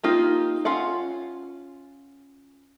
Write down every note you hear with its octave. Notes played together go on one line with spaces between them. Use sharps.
A#3 D#4 F4 G4
C#4 F4 F5 F#5